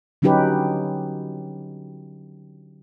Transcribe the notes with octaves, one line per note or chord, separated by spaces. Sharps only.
D3 F#3 C#4 D#4 G4 B4